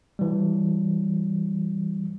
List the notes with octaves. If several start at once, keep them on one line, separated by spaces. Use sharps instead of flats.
E3 G3